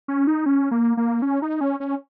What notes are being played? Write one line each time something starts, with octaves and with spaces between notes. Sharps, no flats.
C#4
D#4
C#4
A#3
A#3
C#4
D#4
C#4
C#4